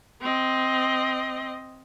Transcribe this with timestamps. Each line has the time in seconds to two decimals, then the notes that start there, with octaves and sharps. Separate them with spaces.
0.21 C4 D#5